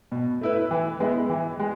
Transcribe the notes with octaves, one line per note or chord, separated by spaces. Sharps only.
B2
A3 E4 B4
E3
G#3 B3 E4
E3
G#3